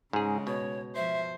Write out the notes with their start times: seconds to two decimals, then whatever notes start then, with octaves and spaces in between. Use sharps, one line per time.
0.13 G#2 C#3 G#3 G#4
0.47 B2 C#5
0.96 F3 C5 E5